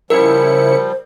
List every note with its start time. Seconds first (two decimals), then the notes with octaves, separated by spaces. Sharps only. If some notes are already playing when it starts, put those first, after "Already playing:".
0.10 C#3 F3 G3 E4 A#4 C5 C#7